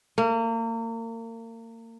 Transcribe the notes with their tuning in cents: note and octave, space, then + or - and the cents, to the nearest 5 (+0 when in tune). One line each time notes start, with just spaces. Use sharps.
A#3 -35